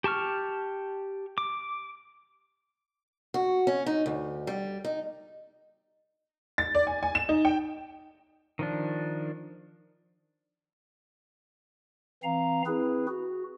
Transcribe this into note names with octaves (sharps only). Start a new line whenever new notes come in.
G4 A5 C#6 F6
D6
F#4
C#4
D#4
D2
G3
D#4
A6
D5
G#5
G#5
E7
D#4
G5
D#3 F3 D4
E3 C4 F5 A#5
C4 E4 G#4 B4
F#4